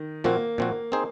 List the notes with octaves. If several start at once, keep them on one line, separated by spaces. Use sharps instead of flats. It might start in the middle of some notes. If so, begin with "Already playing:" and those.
Already playing: D#3
A#2 F3 A#3 C4 F#4
A#2 F3 C4 F#4
C4 D#4 G#4 C5